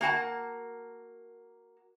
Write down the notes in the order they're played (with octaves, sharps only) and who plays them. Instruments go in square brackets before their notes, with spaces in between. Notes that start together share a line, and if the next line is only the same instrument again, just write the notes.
[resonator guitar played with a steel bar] A#3 F#4 G#5 A5